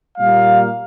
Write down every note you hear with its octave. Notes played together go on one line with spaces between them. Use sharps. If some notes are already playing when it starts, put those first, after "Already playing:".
A#2 G3 A#3 F5